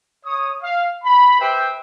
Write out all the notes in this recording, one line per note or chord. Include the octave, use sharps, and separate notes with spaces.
C#5 D#6
F5
B5
G4 B4 C5 E5 G5